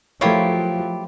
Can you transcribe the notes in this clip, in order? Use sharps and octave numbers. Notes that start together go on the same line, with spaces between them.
F3 F#3 A3 E4 F4 G4 A#4 C#5